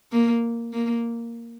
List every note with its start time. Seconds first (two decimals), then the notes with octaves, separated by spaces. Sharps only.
0.12 A#3
0.73 A#3